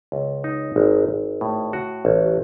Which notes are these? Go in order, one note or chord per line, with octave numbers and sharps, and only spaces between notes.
C#2
D#4
G#1
G#1
A2
F#4
A1